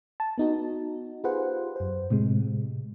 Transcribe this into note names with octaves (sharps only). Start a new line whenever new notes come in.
A5
B3 D#4 F#4
F4 G4 G#4 B4 C5 F#5
F#2 C5
A2 C3 G#3